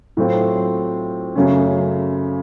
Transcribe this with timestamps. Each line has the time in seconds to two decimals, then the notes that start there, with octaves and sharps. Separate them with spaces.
0.17 A2 F#3 A3 C4 F4
1.36 F#2 C#3 F#3 A3 C#4